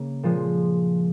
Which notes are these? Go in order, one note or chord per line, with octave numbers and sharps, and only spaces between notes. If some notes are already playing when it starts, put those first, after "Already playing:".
Already playing: C#3 A#3
A#2 F3 G#3